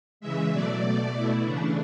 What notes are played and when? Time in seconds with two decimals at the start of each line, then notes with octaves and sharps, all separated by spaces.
0.20 C#3 E3 G#3 E5
0.52 B2 F#3 A3 D5
0.82 B2 A3
1.13 B2 A3 E4
1.44 C#3 E3 A3 D4